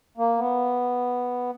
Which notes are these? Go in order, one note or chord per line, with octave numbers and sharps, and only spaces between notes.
A#3
B3